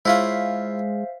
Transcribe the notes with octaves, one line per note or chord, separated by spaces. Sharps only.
G#3 E4 F4 C5 C#5 E5 F5